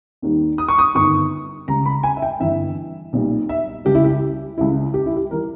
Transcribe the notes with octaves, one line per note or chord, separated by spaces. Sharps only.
D#2 D#3 G3
D#6
C#6
D#6
G1 G2 D#3 C#6
C#2 C#3 G3 A#5
B5
G#5
E5
G5
G1 G2 E3 E5
B1 A#2 G3
E5
C#2 C#3 G3 G4
E4
G4
C#2 C#3 G3 E4
G4
E4
G4
E3 G3 A#4